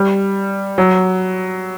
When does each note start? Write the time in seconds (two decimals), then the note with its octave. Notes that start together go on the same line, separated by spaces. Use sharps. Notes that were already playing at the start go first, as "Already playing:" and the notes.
Already playing: G3
0.78 F#3